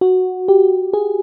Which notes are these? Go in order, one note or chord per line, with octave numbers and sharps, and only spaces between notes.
F#4
G4
G#4